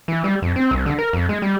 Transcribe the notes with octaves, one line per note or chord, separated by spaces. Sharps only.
E3
G3
F2
C4
C2
D3
A#4
F2
G#3
G3